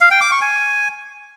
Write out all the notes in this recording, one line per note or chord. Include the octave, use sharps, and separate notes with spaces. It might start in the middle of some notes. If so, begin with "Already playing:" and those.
F5
G5
D6
C#6
G#5